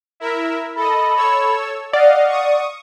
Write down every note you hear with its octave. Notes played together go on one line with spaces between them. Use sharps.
E4 A#4 E5
A4 D#5 B5
A4 C#5 E6
D5 D#5 F5 F#5
C#6 D#6